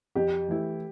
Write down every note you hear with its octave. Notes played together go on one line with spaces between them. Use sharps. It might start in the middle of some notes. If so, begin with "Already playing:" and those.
F2 G4
E3 A3 E4